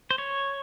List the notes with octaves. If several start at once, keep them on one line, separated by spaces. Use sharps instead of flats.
C5
C#5